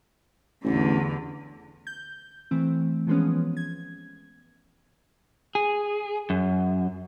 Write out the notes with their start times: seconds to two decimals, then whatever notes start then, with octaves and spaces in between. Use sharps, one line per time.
0.64 A1 E2 D3
1.87 G6
2.51 E3 A3 C4
3.07 E3 F3 G#3 B3 C#4
3.57 G#6
5.55 G#4
6.30 F#2